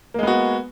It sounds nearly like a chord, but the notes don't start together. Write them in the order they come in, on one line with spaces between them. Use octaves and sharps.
A#3 G#3 B3 F#4